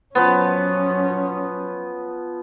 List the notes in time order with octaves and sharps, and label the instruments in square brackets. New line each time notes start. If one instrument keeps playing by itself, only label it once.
[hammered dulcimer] F3 B3 [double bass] F#3 C#4